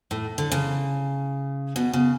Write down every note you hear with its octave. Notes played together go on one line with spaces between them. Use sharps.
A2
D3
C#3
B2
C#3